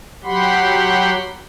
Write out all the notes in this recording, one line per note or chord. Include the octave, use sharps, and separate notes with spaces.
F#3 G4 F#5 B5 C6